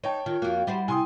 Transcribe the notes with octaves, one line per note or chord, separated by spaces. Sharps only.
D#4 C#5 G5 A5
D#3 F4
F2 A#3 F#4 F5
G3 E4 C5 F#5 B5
C3 E4 G5 G#5 C6 D#6